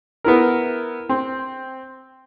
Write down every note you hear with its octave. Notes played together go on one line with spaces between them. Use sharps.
B3 E4 A#4
C4